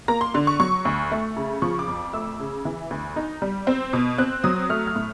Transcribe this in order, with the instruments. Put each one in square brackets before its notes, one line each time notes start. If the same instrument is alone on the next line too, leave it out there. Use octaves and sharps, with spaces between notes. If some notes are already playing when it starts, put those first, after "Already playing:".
[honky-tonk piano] A#3 A#5
C6
D3 C6
C#6
F#3 C#6
D2
A3
C#3
F3 C#6
D6
F2
A3 E6
C#3
E3
D2
D#4
G3
C4
B2
C4 F#6
F#3 D#6
A3 F6
F6
A2